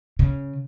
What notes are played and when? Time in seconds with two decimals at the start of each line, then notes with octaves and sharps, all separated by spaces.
0.19 C#3